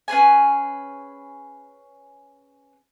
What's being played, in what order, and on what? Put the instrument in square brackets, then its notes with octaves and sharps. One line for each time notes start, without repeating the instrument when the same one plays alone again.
[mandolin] C#4 G#4 B4 G#5